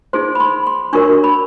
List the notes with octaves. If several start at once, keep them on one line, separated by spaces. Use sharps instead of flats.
D#4 G#4 C5 C6
B5
C6
C6
D4 F#4 A#4 C#5 C#6
B5